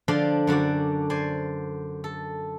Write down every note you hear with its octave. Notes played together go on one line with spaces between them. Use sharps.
D3 F3 D4 D5 F5 C6
F#2 D3 D4 F#4 D5
C5 D5 G#5
A4